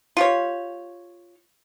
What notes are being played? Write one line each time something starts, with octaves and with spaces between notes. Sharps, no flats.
F4 G4 C#5